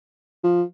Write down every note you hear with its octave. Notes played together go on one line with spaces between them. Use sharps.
F3